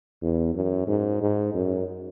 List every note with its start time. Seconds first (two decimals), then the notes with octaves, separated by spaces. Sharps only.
0.22 E2
0.55 F#2
0.88 G#2
1.22 G#2
1.54 F#2